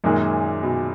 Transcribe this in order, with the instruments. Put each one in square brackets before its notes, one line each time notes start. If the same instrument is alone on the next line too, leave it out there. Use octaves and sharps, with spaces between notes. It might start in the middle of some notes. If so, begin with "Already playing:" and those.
[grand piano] F#2 D#3 G#3 [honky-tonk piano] A#2
[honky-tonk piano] B2